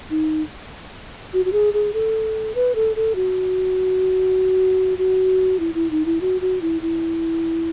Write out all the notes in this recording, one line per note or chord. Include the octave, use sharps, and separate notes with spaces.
D#4
F#4
F#4
G#4
G#4
A4
B4
A4
A4
F#4
F#4
E4
E4
D#4
E4
F#4
F#4
E4
E4